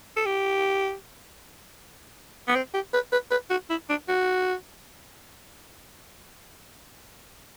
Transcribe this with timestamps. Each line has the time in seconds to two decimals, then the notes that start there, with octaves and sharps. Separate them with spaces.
0.16 A4
0.25 G4
2.48 B3
2.55 C4
2.74 G4
2.93 B4
3.12 B4
3.31 B4
3.50 F#4
3.70 E4
3.89 D4
4.08 F#4